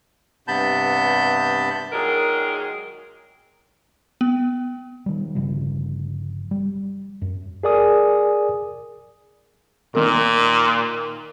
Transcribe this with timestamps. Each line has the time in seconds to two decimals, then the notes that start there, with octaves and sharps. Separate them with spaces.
0.48 G2 C3 B3 A5 B5 G6
1.92 A#2 D#3 F#3 G#3 G#4 A#4
4.21 B3
5.06 D#3 G3
5.35 G1 C#3 F3 G3
6.51 G3
7.22 F#2
7.63 G#4 A#4 D5 G#5 D#6
9.95 A#2 D#3 A#4